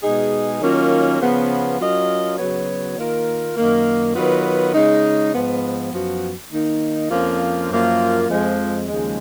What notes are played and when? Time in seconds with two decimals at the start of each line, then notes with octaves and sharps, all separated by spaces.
0.02 B2 G#3 D#4 G#4
0.60 D#3 F#3 A#3 C#4 F4
1.20 C#3 F3 B3
1.79 F#3 C#4 F4 A#4 D#5
2.38 C#3 F#3 B3 F#4 C#5
2.97 D#3 A#3 F4 A#4
3.56 F#2 D#3 A#3
4.15 D#3 F#3 B3 F4 B4
4.74 C#3 G#3 D#4
5.33 G#2 F3 B3
5.92 F#2 F3 B3 F#4
6.51 D#3 A#3 D#4
7.10 F2 F3 A#3 C#4 F4
7.69 F#2 F3 A#3 F4
8.28 F2 F3 G#3
8.87 D#2 C#3 F3 G#3